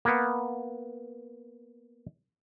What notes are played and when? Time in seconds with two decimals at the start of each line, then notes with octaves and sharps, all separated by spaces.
0.05 A#3 B3